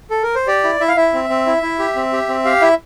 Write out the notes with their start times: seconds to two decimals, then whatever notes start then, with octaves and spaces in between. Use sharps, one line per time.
0.10 A4
0.23 A#4
0.35 C5
0.47 G4 D5
0.64 E4
0.80 E4 E5
0.88 F5
0.96 E4 E5
1.14 C4
1.30 C4
1.46 E4
1.63 E4
1.79 G4
1.96 C4
2.13 G4
2.29 C4
2.45 G4 F5
2.62 E4 E5